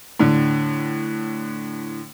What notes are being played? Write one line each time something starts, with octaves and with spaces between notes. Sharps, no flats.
A2 D3